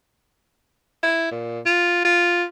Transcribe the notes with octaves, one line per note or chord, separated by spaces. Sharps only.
E4
A#2
F4
F4